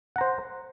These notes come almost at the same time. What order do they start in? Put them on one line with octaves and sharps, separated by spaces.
F#5 A#5 C5